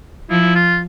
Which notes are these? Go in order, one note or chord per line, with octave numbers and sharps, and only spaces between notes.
F3 E4
F4